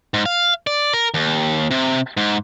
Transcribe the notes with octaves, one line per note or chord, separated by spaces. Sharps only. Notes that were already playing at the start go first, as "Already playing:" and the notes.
G#2
F5
D5
A#4
D#2
C3
G#2